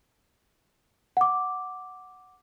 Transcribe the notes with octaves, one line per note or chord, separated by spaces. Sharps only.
F#5 D6